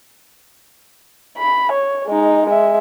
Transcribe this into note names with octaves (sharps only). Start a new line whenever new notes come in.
B5
C#5
G#3 D#4
G#3 E5